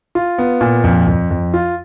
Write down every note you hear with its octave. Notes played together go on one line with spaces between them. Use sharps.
F4
B3
A#2
F2
F2
F2
F4